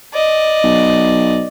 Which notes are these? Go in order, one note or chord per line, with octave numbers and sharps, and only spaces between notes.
D5 D#5
B1